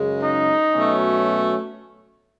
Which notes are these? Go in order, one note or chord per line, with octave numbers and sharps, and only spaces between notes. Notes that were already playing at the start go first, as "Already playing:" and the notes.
Already playing: F#2 C#3 G#3
D#4
B2 F#3 A3 C#4